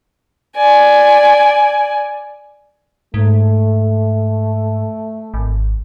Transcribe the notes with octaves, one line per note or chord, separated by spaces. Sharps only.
D5 G#5
G#2 A3
G#1